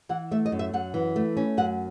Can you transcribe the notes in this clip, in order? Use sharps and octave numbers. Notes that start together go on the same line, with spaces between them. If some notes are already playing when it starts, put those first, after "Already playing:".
E3 F#5
A3 E5
D#5
F#2
E5
F#2 F#5
E3
A3
C#4
F#2 F#5